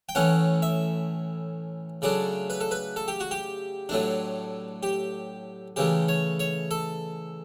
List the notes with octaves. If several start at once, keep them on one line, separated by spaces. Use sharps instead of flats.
G5
A2 E3 A3 C#4 F#5
E5
C#3 F#3 A3 D4 D5
B4
A4
B4
A4
G4
F#4
G4
A2 F#3 A3 D4
G4
C#3 E3 A3 G4
C#5
C#5
A4